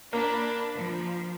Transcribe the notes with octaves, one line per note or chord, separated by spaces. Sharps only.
A#3 D4 B5
F3